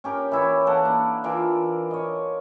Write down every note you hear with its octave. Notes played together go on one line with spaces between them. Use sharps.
C#4 G4 A#4
E3 E4 C#5
A#3 A4 D5 F#5
D4
E3 F4 A#4 D5
C#5 D#5